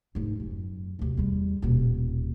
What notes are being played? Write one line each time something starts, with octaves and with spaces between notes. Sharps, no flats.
F1 G#2
F#2
D2 C3
E2 G3
D#1 B2